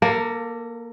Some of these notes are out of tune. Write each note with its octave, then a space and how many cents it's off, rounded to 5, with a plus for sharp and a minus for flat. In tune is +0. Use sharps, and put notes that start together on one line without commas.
A#3 +10 A4 +35